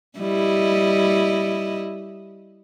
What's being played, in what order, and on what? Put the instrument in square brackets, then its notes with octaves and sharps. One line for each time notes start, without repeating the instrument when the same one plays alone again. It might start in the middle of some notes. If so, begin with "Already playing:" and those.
[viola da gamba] G3 E4 D#5